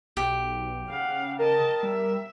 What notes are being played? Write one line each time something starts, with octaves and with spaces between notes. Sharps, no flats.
B1 G4
C#3 F5 F#5
A#4 D#5 A5
G3 E5